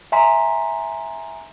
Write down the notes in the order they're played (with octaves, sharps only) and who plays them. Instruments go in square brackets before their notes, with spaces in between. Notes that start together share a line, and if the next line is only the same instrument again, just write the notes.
[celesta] E5 G#5 A#5 C6 B6